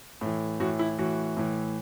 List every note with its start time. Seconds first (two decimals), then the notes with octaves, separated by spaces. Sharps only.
0.21 A2 E3
0.60 A2 E3 F#4
0.79 E4
0.98 A2 E3 F#4
1.37 A2 E3